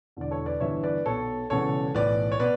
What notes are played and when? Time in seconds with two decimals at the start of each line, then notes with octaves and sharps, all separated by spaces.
0.17 E1 E2 D3 D5
0.31 A4 C#5
0.46 B4 D5
0.60 G1 G2 E3 C#5 E5
0.83 B4 D5
1.06 B1 B2 A4 C#5
1.50 E1 E2 C#3 E3 A4 C#5
1.95 B1 A2 E3 B4 D5
2.32 C#5
2.40 B2 B4 D5